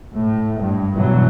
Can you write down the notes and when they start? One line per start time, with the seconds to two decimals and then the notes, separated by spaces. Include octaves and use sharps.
0.13 A2
0.61 G2
0.96 G2 B2 E3 F#3